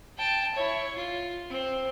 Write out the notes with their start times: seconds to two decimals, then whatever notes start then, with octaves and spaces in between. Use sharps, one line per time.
0.17 G5 A5
0.54 E4 C#5
0.95 F4
1.50 C4